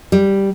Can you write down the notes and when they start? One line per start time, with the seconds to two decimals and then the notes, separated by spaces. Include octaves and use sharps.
0.12 G3